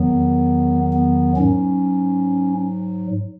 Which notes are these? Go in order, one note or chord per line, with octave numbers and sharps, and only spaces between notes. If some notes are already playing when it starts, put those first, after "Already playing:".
Already playing: E2 D#3 F#3 B3
B3
G#2 F#3 C#4